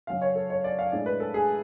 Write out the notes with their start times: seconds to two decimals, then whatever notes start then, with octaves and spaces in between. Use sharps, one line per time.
0.07 C#3 F#3 C#4 F5
0.22 C#5
0.35 A4
0.50 C#5
0.64 D5
0.79 F5
0.92 A2 G#3 D4 D5
1.06 B4
1.20 A4
1.34 G#4